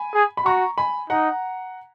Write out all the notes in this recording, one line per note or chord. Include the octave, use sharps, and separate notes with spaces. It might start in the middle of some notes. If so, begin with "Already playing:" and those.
Already playing: G#5 B5
G#4
B5
F#4 A#5 C#6
G#5 B5
D#4 F#5 A#5